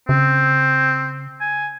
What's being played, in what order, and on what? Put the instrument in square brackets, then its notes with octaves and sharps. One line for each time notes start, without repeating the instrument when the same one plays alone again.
[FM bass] C#3 [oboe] C4
[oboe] G#5